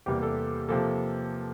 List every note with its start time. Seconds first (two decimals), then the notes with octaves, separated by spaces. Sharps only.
0.06 E2 C3 G3 A#3 G4
0.22 A4
0.69 C3 F3 A#3 A4